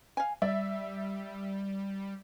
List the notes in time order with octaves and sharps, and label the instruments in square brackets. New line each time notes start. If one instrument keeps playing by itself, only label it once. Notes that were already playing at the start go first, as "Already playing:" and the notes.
[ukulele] F5 G#5
[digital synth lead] G3 [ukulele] D5 [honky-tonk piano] E5